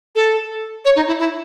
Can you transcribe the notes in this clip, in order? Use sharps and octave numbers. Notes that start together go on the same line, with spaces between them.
A4
C#5
D#4
E4
E4